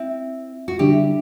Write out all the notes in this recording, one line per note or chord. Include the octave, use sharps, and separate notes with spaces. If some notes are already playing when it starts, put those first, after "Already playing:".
Already playing: C4 E4
F#4
D3 G3 D4 E4 G4